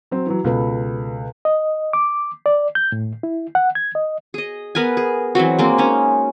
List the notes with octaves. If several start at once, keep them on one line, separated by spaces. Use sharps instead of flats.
F#3 C4
E3 F#3
C#2 B2 A4 B4
D#5
D6
D5
G6
A2
E4
F#5
G#6
D#5
G#4 D#5
B3 A#4 B4 G#5
G#4
E3 F#3 C4 F#4
G#3 A#3 C4
C#4 D#4